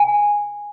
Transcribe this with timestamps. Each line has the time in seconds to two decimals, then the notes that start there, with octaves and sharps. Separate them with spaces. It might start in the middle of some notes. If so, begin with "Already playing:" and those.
Already playing: G#5